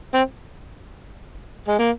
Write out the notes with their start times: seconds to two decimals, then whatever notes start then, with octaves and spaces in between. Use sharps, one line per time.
0.14 C4
1.68 G#3
1.79 A#3